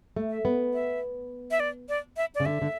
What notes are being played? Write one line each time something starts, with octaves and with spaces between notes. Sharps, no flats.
A3
E5
B3
E5
E5
D5
D5
E5
C#3 D5
D3 E5
D3